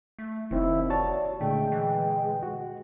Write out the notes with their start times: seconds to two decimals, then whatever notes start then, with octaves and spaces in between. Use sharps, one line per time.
0.19 A3
0.51 F1 D#2 D#3 C4 D#4 E4
0.90 F#4 C#5 D5 A5
1.41 A#2 D3 G#3 A3 G#4 G5
1.72 E3 G5
2.43 F#4